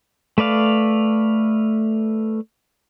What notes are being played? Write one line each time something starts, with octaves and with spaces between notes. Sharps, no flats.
A3 B4 D5 F5